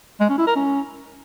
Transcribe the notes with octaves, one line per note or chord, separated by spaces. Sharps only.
G#3
C#4
E4
A#4
C#4